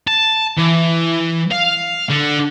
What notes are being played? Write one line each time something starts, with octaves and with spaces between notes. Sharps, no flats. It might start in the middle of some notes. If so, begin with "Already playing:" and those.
A5
E3
F5
D3